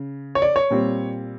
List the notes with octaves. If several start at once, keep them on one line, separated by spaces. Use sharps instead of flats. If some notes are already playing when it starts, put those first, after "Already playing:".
Already playing: C#3
C#5
D5
C#5
A#2 G3 C4